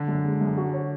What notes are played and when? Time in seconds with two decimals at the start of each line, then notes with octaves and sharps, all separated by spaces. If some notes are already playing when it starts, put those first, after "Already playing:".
Already playing: D3
0.08 F#2
0.24 G#3
0.41 F#2
0.57 F#4
0.73 C#5